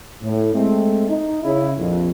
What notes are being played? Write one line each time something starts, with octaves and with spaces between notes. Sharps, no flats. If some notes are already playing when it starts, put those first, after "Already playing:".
A2
G#3 A3 C4
D#4
C#3 E4
A#1 F2